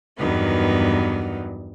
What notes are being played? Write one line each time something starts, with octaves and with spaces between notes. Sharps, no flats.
E2 G2 D#3 F#3 B3